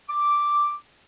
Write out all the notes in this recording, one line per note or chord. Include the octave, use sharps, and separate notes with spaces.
D6